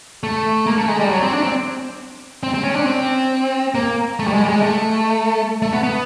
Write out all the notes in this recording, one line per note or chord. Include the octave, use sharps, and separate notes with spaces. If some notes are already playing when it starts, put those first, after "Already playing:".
A3
A#3
A3
G#3
G3
F#3
C4
D4
C4
C4
C4
C#4
D4
C4
A#3
A3
G3
G#3
G3
G#3
A3
A3
B3
B3